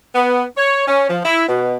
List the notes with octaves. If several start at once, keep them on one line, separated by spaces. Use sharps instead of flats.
B3
C#5
C#4
F3
E4
B2